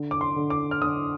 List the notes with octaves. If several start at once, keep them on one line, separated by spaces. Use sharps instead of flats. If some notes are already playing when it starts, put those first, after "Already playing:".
Already playing: D3
D6
C6
D3
D6
F6
D3 D#6